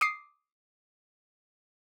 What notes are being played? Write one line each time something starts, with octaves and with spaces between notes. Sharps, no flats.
D6 D#6 C7